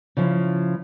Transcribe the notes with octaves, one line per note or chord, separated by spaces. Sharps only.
C#3 F3 E4